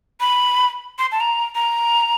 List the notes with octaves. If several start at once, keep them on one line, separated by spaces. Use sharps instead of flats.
B5
C6
A5
A#5
A#5